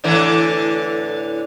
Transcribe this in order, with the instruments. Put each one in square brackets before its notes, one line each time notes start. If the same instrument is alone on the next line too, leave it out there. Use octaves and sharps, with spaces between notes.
[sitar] A2 D3 E3